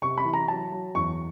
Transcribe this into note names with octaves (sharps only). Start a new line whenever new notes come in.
C3 C#6
B5
E3
A#5
F#3 A5
F#3
E2 C#6